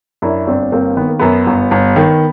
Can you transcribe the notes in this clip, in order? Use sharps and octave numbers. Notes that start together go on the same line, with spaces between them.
F#2 D4 E4
G1 C4 D4
G1 A#3 C4
D#3 B3
A#3
F#2 B3
G1
G1
D#3